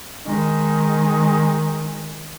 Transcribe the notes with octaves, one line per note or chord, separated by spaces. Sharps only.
D#3 G#3